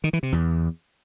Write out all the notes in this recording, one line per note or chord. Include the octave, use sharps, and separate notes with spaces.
D#3
E3
C3
E2